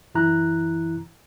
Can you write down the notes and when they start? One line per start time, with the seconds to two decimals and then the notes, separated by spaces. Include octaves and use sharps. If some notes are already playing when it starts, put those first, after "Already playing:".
0.15 F#2 E3 E4 A#5 F#6